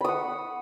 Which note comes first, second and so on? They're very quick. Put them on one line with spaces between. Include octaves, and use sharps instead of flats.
B5 D#6 F#5